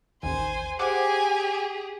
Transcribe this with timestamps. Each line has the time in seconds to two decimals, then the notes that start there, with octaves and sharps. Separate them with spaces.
0.23 A1 D#2 C5 G#5
0.79 G4 G#4 C5 F#5 G#5 D6